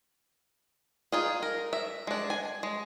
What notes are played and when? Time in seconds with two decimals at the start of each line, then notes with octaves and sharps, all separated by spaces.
1.12 D#4 F4 G#4
1.43 A#4
1.73 E5
2.07 G#3 D4
2.30 G#5
2.63 G#3